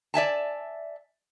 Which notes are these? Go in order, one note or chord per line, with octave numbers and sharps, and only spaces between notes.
D5 E5 G#5 A5